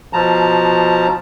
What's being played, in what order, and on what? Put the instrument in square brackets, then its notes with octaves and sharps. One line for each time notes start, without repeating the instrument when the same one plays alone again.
[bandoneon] B2 F3 A5 A#5